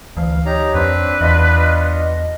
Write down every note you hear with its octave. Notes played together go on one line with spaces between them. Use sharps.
D2 E3 F5
D#4 G4 C#5 A#5
F2 C4 D4 B4
E2 B3 D4 F4 D#5